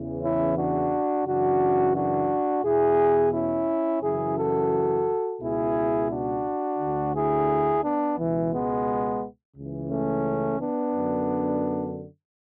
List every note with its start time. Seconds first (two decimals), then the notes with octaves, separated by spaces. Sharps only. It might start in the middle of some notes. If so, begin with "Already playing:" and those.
Already playing: E2 C#3 E3
0.22 C#4 E4
0.57 D4 F#4
1.26 F#2 C#3 E3 D4 F#4
1.95 D4 F#4
2.64 E2 B2 E4 G#4
3.33 C#4 E4
4.03 F#2 C#3 E3 E4 G#4
4.38 F#4 A4
5.41 C#2 B2 E4 G#4
6.10 D4 F#4
6.79 D2 D3
7.14 E4 G#4
7.83 B3 D4
8.17 C#2 B2 E3
8.52 G#3 B3
9.56 C#2 C#3 E3
9.90 A3 C#4
10.60 B3 D4
10.95 F#2 D3